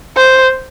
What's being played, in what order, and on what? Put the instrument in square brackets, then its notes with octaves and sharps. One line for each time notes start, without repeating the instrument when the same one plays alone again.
[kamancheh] C5